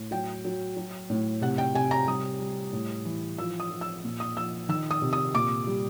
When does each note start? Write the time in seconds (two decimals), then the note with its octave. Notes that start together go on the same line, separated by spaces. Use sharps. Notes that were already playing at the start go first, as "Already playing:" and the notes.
Already playing: A2
0.11 F#3 G5
0.45 F#3
0.77 F#3
1.10 A2
1.42 C3 F#5
1.58 G5
1.74 C3 G#5
1.91 A#5
2.07 G3 D#6
2.40 G3
2.72 A2
3.05 E3
3.38 F3 E6
3.60 D#6
3.70 F3
3.81 E6
4.04 A#2
4.20 D#6
4.37 F3 E6
4.69 D#3 E6
4.91 D#6
5.02 C3
5.13 D#6
5.34 A#2 D6
5.67 G3